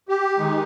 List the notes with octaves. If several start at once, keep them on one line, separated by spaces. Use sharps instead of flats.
G4
D#3 G#3 D#4